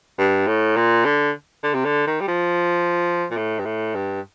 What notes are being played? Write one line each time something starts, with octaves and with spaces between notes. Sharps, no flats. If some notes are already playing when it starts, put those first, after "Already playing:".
G2
A2
A#2
D3
D3
C3
D3
D#3
G3
F3
A#2
A2
G2
A2
G2